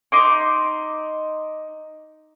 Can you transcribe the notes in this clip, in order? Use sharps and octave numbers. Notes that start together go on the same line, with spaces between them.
D#4 C6 D6